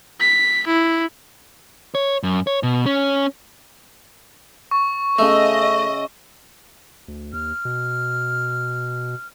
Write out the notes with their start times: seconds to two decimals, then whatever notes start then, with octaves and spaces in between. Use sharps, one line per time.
0.20 B6
0.67 E4
1.95 C#5
2.23 F#2
2.47 C#5
2.63 B2
2.86 C#4
4.71 C#6
5.19 C#3 A3 D#5 E5
7.08 D2
7.33 D#2 F6
7.65 B2